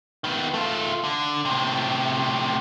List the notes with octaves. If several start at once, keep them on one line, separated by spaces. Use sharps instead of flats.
D#3 B3
A3 F4
D3
A2 C3